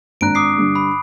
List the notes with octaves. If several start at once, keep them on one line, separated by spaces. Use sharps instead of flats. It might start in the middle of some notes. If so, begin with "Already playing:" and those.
G#1 D4 A#5 F#6 D7
D6 D#6 C7
G2 D3
B5